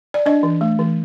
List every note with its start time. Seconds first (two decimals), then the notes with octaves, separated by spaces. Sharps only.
0.14 D5
0.26 D4 D#5
0.43 E3
0.61 A3
0.79 E3